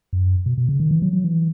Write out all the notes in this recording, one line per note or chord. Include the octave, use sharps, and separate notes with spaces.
F#2
B2
B2
C#3
D#3
E3
F#3
F#3
E3